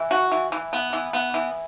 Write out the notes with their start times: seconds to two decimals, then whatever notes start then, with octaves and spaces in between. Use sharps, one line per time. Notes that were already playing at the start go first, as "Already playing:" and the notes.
Already playing: E3
0.11 F#4
0.32 E3
0.52 E3
0.73 B3
0.93 E3
1.13 B3
1.34 E3